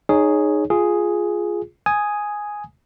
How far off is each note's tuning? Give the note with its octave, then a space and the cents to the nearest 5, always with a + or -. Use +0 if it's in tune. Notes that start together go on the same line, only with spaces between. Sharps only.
D#4 -20 G#4 +0 C#5 +0
F4 +0 G#4 +0
G#5 +0 D#6 +0